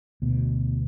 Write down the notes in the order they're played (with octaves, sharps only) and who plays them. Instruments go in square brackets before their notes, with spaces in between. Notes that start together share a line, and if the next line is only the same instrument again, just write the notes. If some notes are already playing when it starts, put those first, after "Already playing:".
[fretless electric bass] D2 B2